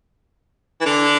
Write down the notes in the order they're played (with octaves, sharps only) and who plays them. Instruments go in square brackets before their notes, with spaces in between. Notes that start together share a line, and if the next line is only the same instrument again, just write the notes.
[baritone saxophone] E3
D3